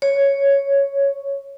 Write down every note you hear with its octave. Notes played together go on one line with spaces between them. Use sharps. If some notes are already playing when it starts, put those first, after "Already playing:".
C#5